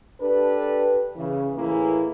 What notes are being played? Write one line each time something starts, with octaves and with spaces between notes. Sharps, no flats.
D4 G4 A4 B4
C#3 E3
A2 E3 A#3 E4 G#4